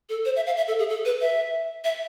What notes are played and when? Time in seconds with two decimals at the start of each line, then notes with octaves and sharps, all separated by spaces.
0.09 A4
0.25 C5
0.36 E5
0.46 F5
0.57 E5
0.68 A4
0.79 G#4
0.89 A4
1.05 B4
1.21 E5
1.84 E5